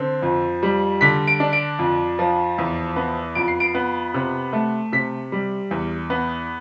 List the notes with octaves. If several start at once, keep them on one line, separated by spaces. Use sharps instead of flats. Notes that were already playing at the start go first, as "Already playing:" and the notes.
Already playing: D3 C4
F2
G3
D3 B6
D7
D4
D7
F2
F3
E2
B3
F2 D7
C7
D7
B3
C3
A3
C3 B6
G3
E2
B3